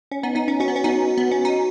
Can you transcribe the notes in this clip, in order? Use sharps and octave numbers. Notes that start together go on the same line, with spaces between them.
C#4
B3 D#4
B3 D#4
C#4
C#4 F#4
B3
C#4
B3 D#4
B3
C#4
D#4